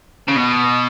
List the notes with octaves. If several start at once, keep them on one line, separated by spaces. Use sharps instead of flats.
C#3
B2